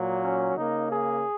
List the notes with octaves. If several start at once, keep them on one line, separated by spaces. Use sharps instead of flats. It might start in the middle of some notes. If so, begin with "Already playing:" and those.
Already playing: A#2 F#3 A#3
C#4
C#3 A#3 D#4
G#4